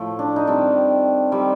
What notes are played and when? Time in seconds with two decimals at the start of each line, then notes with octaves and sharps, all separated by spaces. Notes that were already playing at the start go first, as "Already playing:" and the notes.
Already playing: A2 F3 A3
0.19 D4
0.36 D#4
0.47 D#3 G3 C4 D4
1.32 D#3 G3 C4